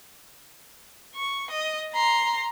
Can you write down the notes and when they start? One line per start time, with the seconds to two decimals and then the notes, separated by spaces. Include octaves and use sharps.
1.16 C#6
1.51 D#5
1.93 A#5 C6